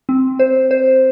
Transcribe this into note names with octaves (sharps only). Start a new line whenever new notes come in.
C4
C5
C5